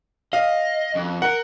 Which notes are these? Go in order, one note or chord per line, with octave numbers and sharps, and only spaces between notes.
D#5 F5
F2
A#4 F#5